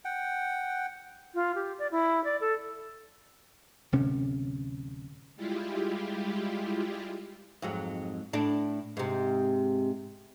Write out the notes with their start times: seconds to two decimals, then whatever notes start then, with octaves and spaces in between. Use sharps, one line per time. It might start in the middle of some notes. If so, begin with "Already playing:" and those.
0.05 F#5 G5
1.35 F4
1.55 G4
1.79 D5
1.91 E4
2.24 D5
2.41 A4
3.92 D1 C3 C#4
5.36 G3 G#3 E4 F4 G4
7.62 F2 G#2 F#3
8.33 A2 D4
8.97 G#2 C3